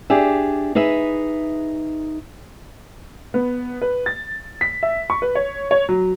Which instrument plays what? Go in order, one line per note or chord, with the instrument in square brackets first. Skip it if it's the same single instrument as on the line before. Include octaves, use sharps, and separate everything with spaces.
[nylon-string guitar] D4 G4 G#4 E5
D#4 G#4 B4 E5
[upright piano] B3
B4
A6
B6
E5
C#6
B4
C#5
C#5
F#3